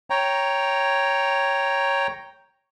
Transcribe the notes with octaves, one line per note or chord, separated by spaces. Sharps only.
C#5 G5 A#5